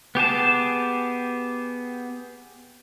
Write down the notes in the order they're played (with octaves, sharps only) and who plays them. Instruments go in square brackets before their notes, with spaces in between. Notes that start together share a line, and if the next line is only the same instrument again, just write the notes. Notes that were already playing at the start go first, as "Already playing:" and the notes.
[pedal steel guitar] B3 G4 G#4 A5